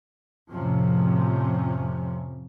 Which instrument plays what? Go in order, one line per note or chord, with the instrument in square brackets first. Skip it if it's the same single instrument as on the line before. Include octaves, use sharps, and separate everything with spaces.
[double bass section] F2 A2 C3 F3 C#4